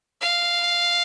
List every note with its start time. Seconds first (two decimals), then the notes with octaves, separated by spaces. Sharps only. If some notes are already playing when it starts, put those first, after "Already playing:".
0.21 F5